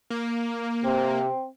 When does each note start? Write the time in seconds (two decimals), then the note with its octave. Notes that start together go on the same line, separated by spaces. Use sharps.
0.10 A#3
0.84 C3 C4